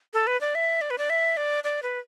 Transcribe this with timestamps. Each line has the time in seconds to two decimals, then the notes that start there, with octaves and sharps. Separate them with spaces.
0.14 A4
0.27 B4
0.41 D5
0.55 E5
0.81 D5
0.90 B4
0.98 D5
1.10 E5
1.37 D5
1.64 D5
1.83 B4